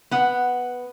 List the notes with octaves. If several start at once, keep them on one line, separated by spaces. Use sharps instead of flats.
B3 F#5